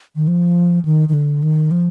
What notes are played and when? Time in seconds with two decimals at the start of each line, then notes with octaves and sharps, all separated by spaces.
0.16 D#3
0.28 F3
0.85 D#3
1.09 D#3
1.14 D3
1.43 D#3
1.71 F3